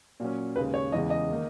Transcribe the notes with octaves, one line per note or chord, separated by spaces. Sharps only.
A#2 F#3 C#4
D#2 C#3 G#3 B4
C#5
E2 C#3 E3 G#3 D#5
D#5
D#3 A#3 D#4